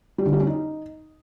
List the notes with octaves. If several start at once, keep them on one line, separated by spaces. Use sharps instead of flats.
G3
D3
G3
C#4
D#4